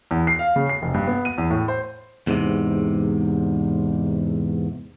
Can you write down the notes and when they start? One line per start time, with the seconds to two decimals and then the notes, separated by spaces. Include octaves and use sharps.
0.11 E2
0.27 C7
0.39 F5
0.56 C#3
0.69 C7
0.82 F1
0.94 G2
1.07 B3
1.25 D#7
1.38 E2
1.50 A2
1.68 C5
2.27 E2 G#2 C3